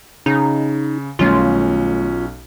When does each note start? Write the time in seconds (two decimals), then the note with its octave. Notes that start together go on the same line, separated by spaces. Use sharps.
0.26 C#3 D#4
1.19 B1 D#3 G3 A3 C#4 F4